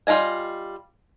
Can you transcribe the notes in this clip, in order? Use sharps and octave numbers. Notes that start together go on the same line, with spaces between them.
G3 F4 A4 D#5 G#5